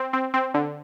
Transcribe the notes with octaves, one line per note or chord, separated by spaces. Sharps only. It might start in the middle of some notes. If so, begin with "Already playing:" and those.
Already playing: C4
C4
C4
D3